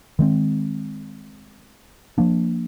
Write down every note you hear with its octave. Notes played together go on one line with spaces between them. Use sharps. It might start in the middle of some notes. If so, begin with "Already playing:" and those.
D#3 G#3 C4
F3 A#3 D4